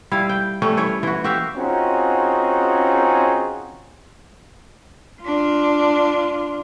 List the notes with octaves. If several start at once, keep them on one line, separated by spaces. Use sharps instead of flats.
G3 E4 F5
G5
G3 A3 C#4
E3 C#5 E5
E3 F#4
F#4 G4 E5 F5
C4 C#4 D#4 F4 F#4 G#4
D4 F4